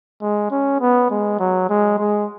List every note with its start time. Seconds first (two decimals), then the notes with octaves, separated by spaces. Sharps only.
0.22 G#3
0.51 C#4
0.81 B3
1.11 G#3
1.40 F#3
1.69 G#3
1.99 G#3